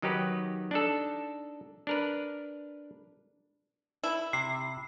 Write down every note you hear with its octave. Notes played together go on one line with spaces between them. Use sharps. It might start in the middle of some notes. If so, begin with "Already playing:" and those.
D#3 F#3 D#4 G4 B4
D4 D#4 A4
D4 A#4 B4
E4
C3 C7